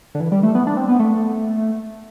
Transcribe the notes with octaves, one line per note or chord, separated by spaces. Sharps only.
D3
E3
G3
A3
B3
D4
C4
B3
A3